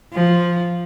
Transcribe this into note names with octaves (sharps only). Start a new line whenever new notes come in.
F3